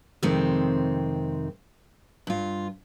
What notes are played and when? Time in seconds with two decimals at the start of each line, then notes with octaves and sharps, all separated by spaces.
0.23 F2 C3 D#3 G#3 C4
2.27 G2 F4